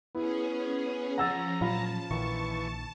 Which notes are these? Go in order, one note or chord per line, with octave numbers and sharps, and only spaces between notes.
B3 C#4 E4 G#4
F3 C#4 F#5 A#5 E6 A6
A#2 F#3 F4 F5 A5 B5
A#1 A#2 D#3 E3 C#6